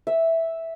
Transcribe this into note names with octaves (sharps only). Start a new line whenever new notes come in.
E5